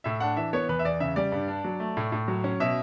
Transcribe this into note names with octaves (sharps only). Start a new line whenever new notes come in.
A2 E5
D4 F#5
E3 E5
B3 C#5
E2 B4
E5
E2 D5
C#3 E5
G3 D5
G2
D4
F#3
A3
A2
A2
F#3
C#4
B2 E5